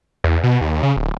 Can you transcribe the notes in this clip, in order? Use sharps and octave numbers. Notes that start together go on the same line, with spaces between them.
E2
B2
D#2
C#3
D1